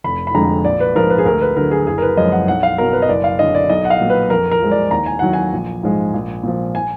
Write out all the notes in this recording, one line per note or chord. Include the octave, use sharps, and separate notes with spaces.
F1 B5
B5
F2 D3 G#3 A#5
A#1 D5
B4
G#2 F3 G#3 A#4
B4
G#4
D2 A#4
B4
D3 F#3 A#4
G#4
F#1 G#4
A#4
B4
F#2 F3 G#3 D#5
F#5
B1 F#5
F5
B2 F#3 A#4
B4
D#5
F#1 D5
F5
F#2 D3 D#5
D5
B1 D#5
F#5
F5
A#2 F#3
B4
F2 A#4
A#4
F3 G#3
D5
D#2 A#5
G#5
D#3 F#3 F#5
G#5
A#1
G#2 F3 G#3
A#1
A#2 F3
G#5